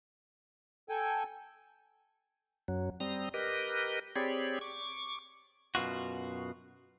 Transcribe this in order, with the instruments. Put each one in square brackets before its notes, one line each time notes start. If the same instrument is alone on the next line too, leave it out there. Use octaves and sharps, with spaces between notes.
[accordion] A4 G5 G#5
[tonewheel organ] F#2 F#3
G3 C4 A#5 D#6 A#6
G4 A#4 B4 D#5
C4 G4 G#4 C#5 D5 B5
C#6 D6
[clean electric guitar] F#2 B2 F4 F#4